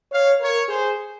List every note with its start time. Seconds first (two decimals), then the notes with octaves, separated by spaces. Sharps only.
0.12 C#5 F5
0.41 A#4 C#5
0.69 G#4 C5